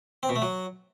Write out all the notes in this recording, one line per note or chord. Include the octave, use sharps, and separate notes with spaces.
C4
B2
A3
F#3